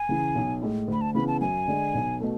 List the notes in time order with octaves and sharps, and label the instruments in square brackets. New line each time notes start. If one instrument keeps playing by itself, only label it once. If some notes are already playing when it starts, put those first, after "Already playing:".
Already playing: [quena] G#5
[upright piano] C#3 E3
B1
A2 G#3
[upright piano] D2 [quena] B5
[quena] A5
[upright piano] C#3 E3 B3 [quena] B5
[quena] A5
[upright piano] F#2 [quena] G#5
[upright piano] D3 G#3
B1
B2 A3